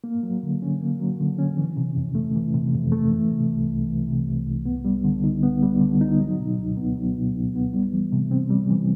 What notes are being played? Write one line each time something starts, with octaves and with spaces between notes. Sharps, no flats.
A#3
F#3
D3
C#4
A#3
F#3
D3
C#4
E3
C3
F2
A3
E3
C3
F2
A3
E3
C3
C2
C2
E3
C3
C2
C2
B3
G3
D3
D#4
B3
G3
D3
D#4
F#3
B2
C#2
B3
F#3
B2
C#2
B3
G3
E3
C3
C4
G3
E3